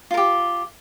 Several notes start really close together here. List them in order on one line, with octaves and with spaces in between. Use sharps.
F4 A#4 G4